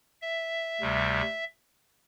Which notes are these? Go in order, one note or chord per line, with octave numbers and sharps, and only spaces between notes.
E5
D2 C3 G3